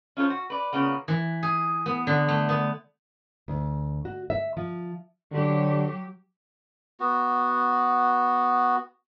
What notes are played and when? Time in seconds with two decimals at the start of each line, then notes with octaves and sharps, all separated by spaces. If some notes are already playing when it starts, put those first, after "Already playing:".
0.17 C#4 F4 A4 C5
0.30 F#4
0.50 B4 D5
0.73 A#2 C#3 B3
1.08 E3
1.43 G#4
1.86 B3
2.07 D3
2.28 A3
2.49 B3
3.48 D2
4.05 F#4
4.30 E5
4.57 F3
5.32 D3 F#3 G4
7.00 B3 F#4